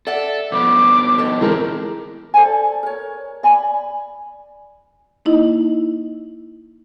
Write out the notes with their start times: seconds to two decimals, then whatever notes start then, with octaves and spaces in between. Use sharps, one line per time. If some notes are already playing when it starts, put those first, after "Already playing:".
0.07 A4 D5 E5 F#5
0.52 B2 F3 B3 D6
1.18 A2 D#4 A4
1.41 B2 E3 G#3 C4 A#4
2.34 A4 C5 D5 G#5
2.83 A#4 C#5
3.43 D5 G#5 B5
5.25 A#3 D#4 E4 D#5